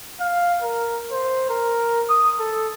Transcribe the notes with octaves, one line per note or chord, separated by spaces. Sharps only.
F5
A#4
C5
A#4
D#6
A4